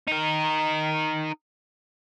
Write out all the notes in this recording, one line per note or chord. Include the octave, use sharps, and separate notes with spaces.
D#4 A#4